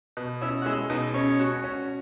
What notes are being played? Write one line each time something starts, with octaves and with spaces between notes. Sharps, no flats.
B2
C#4 E4
F#4
G#3 E4
B2 D#4
C#4 C#5
F#4
C#4